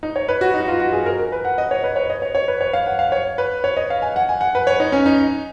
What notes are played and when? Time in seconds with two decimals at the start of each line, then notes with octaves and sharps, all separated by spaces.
0.03 D#4
0.16 C#5
0.28 B4
0.41 F#4
0.54 D#4
0.61 F#4
0.68 F4
0.80 F#4
0.92 G#4
1.06 A#4
1.19 A#4
1.32 B4
1.45 F#5
1.58 D#5
1.71 C#5
1.84 B4
1.96 C#5
2.10 D#5
2.22 C#5
2.35 C#5
2.48 B4
2.61 C#5
2.73 F5
2.87 F#5
2.99 F5
3.12 C#5
3.38 B4
3.64 C#5
3.77 D#5
3.90 F5
4.02 G#5
4.16 F#5
4.29 G#5
4.41 F#5
4.55 B4
4.67 C#5
4.80 D#4
4.92 C#4
5.06 D#4